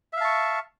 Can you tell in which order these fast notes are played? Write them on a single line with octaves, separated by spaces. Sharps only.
E5 F5 A5 C#6